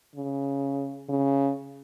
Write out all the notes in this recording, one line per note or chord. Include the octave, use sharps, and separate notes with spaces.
C#3
C#3